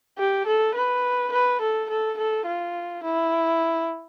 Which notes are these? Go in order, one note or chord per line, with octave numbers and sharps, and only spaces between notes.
G4
A4
B4
B4
A4
A4
A4
F4
E4